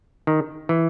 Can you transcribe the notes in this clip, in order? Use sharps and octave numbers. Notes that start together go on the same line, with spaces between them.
D#3
E3